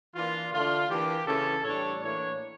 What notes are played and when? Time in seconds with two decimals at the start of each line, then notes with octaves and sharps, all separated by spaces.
0.15 E3 A#3 D4 F4
0.52 D3 A3 D4 F4
0.90 E3 A#3 D4 G4
1.26 C#3 E3 A3 C#4 A4
1.63 A2 E3 G3 D4 C#5
2.00 A2 E3 A#3 D4 C#5